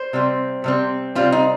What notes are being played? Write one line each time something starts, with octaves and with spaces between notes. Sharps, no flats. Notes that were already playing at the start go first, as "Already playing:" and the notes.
Already playing: C5
C3 G3 C4
C3 G3 C4
C3 G3 C4 F4
D#4